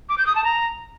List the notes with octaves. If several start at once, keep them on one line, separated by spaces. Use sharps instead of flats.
D6
G6
D#6
A5
A#5